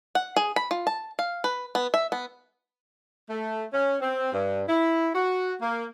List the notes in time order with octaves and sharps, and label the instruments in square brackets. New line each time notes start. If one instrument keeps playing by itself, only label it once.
[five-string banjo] F#5
G#4
B5
F4
A5
F5
B4
B3
E5
B3
[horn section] A3
C#4
C4
G2
E4
F#4
A#3